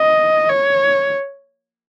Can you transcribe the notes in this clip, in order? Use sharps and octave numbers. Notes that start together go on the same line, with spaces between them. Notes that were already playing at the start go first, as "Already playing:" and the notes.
Already playing: D#5
C#5